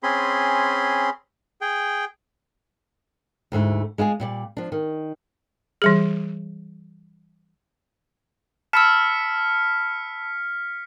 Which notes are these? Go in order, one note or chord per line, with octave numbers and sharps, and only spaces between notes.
C4 C#4 G#4 B5 C6
G#4 G5
D2 G#2 A3 E4
G#3 E4 F4 G#4
A#2 G3 D5
F3 D4
D#3
E3 G3 G#4
A5 B5 E6 F6 B6 C#7